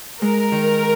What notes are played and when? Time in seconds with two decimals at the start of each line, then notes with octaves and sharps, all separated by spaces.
0.22 G#3 A#4
0.52 D#3